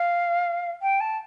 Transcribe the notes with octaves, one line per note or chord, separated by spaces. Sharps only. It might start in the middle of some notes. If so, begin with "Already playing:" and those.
Already playing: F5
G5
A5